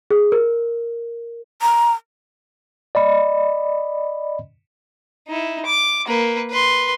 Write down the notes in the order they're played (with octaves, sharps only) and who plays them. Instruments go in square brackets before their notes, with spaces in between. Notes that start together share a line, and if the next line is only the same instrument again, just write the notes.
[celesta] G#4
A#4
[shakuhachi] A#5
[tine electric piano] D5 D#5 B5
[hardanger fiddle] D#4 E4
D6
A#3 B4
B4 C6